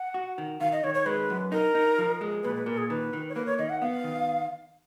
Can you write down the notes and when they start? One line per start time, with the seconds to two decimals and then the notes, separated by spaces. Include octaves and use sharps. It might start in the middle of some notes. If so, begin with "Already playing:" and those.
Already playing: F#5
0.14 F#4
0.38 D#3
0.61 D#3 F5
0.72 D#5
0.84 D#3 C#5
0.95 C#5
1.06 G#3 B4
1.30 F#2
1.52 D#4 A#4
1.75 D#4
1.98 F3
2.21 G#3
2.43 A#2 B4
2.56 B4
2.66 A#2 A#4
2.78 G#4
2.90 D#3 B4
3.13 D#3
3.29 C#5
3.35 A#3 B4
3.46 C#5
3.59 D#3 D#5
3.69 F#5
3.82 B3 F5
4.04 D#3